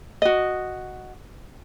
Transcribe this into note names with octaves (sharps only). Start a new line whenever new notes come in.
F#4 D#5